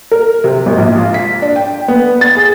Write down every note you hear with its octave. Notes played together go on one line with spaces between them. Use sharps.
A#4
C3
G#1
A#1
F4
B6
D4
G5
B3
A6
G#4